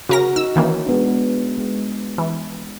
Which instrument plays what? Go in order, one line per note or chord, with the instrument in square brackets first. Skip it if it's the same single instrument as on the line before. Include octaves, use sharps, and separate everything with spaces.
[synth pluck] C#3 A#4 A#6 [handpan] F#4
[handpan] D#4 [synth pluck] E6
[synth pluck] D#3 E3 A#3 [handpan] C#4
[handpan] G#3 B3 D4
G#3
[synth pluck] E3